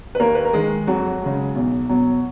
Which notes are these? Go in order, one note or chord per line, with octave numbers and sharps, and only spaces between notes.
B4
D#2 A#3 A#4
B4
A#4
D#3 G#3 G#4
F2 F#3 F#4
C#3 G#3
B1
B2 F#3